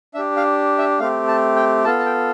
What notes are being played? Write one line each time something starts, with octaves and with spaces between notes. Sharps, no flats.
D4 G4 E5
F5
E5
A3 C4 G4 F5
A5
G5
B3 F4 A4 A5
A5
G5